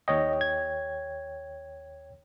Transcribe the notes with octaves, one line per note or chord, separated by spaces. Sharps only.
D#2 C#5 D#5 G5
G#6